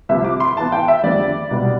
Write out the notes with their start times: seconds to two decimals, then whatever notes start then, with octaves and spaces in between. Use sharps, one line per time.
0.09 C2 C3 F3 E5
0.25 D6
0.40 C6
0.56 A2 E3 B3 A5
0.72 G5
0.88 E5
1.04 F2 D3 G3 B3 D5
1.51 C2 B2 G3 B3